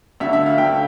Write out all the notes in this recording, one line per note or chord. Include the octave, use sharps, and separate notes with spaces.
D2 D3 E5
E5
F5
D2 D3 G5